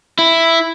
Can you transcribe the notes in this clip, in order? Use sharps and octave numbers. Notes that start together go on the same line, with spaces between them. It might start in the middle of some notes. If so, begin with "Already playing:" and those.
E4